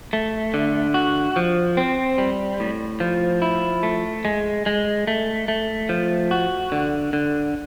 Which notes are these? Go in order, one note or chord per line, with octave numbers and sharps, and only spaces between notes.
A3
D3
F#4
F3
C4
G3
A2
F3
E4
A3
G#3
G#3
A3
A3
F3
F#4
D3
D3